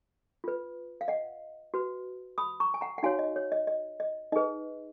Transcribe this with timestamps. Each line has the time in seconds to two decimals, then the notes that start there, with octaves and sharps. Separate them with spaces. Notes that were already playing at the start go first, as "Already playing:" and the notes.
0.44 F4 B4
1.01 F5
1.08 D#5 F#5
1.74 F#4 B4
2.38 B5 D#6
2.60 A#5 C#6
2.74 G#5
2.81 F#5 A#5
2.98 F#5
3.03 D#4 F#4 C#5 F5 G#5
3.19 D#5
3.36 C#5
3.52 D#5
3.67 D#5
4.00 D#5
4.32 D#4 G#4 B4 D#5